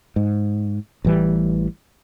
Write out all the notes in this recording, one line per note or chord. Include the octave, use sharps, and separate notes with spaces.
G#2
A1 A2 E3 G3